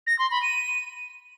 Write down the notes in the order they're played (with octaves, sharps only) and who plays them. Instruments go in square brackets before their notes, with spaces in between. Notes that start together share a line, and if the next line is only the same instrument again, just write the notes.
[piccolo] A#6
C6
B5
D#7